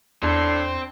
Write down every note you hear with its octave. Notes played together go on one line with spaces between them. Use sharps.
E2 A2 C4 D4